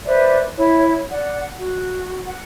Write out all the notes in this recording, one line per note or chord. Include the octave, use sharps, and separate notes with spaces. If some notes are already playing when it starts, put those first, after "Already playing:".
B4 C5 D5 E5
E4 C#5
D5 F#5
F#4
F#5